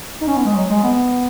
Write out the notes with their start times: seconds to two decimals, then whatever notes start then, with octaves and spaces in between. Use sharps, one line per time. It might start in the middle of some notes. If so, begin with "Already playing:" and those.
0.21 D#4
0.28 C#4
0.37 B3
0.45 G#3
0.56 F#3
0.70 G#3
0.84 B3